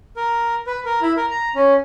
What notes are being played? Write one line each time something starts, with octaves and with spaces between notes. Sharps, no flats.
A#4
B4
A#4
E4
A#4
A#5
C#4